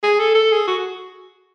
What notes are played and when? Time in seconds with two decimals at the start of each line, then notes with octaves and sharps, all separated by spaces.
0.03 G#4
0.19 A4
0.35 A4
0.52 G#4
0.68 F#4